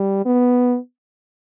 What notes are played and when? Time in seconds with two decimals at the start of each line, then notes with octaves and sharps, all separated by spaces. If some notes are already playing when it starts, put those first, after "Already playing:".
Already playing: G3
0.25 B3